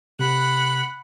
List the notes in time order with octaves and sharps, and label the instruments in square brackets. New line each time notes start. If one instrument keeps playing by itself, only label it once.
[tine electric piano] C3 [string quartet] F#5 B5 F#6